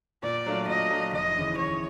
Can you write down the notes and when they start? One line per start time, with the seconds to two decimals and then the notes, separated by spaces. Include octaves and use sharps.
0.23 A#2 D5
0.46 F#3 A3 D4 F4
0.68 A#2 D#5
0.90 F#3 A3 D4 F4
1.13 F1 D#5
1.36 D#2 C#3 E3
1.58 F1 C#5